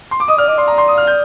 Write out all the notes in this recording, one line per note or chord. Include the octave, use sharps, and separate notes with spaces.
C6
D6
D#5 D#6
D5 F6
D#5 D6
D5 C6
A#5
C6
D#6
F6
G6